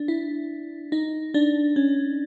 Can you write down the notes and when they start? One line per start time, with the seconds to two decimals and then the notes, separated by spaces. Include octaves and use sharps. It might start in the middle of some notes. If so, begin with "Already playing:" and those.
Already playing: D4
0.08 E4
0.92 D#4
1.34 D4
1.76 C#4